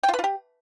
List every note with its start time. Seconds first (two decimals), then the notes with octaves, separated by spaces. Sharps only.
0.03 G5
0.08 F4
0.14 B4
0.19 F4
0.24 G4